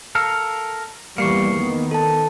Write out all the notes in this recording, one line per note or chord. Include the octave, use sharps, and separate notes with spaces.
A4 A#4 F5
E2 E3 G3 A#3 C#6 C7 C#7
D#3 B3
A4 A5